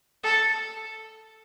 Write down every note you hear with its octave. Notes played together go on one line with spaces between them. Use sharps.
A4